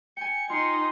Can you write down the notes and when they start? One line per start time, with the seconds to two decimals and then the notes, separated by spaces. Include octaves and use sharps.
0.17 G5 G#5 C#7
0.50 D#4 F4 C6